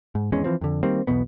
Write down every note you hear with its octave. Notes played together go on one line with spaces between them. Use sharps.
G#2
G#1 E2 G#3 C#4
E3 F3 C4
F2 D3
D#3 G3 A#3 C4
B1 E2 B2 B3